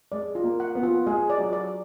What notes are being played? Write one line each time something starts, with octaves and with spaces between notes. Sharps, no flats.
G#3 D5
F4
A#3
F#5
B3
F4
G#3 G#4
D5
F#3
D5